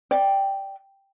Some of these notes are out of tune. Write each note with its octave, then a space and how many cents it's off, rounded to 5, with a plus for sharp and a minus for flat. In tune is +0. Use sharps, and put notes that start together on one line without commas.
D5 +0 G5 +0